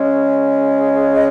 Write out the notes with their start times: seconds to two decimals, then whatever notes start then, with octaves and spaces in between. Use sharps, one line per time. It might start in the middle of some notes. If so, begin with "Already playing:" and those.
Already playing: C#3 G#3 C#4
1.15 D#5